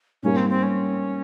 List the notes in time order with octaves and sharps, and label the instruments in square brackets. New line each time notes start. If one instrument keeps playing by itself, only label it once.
[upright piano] G#2 G3 A#3 [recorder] C#4
[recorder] C4
C4
C#4